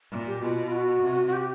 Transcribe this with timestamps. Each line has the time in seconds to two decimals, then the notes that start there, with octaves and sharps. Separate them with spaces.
0.11 A#2
0.27 G4
0.42 B2 F4
0.66 F4
0.72 F#4
1.02 C3
1.27 F#4
1.33 G4